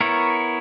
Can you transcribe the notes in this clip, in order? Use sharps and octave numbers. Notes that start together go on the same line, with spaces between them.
B3 E4 A#4 C#5